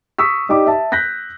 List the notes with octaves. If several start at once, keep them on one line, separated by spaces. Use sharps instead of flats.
C#6 D#6 E6 B6
D#4 G4 D5 D6
E5 A5
F#6 G6 A#6 B6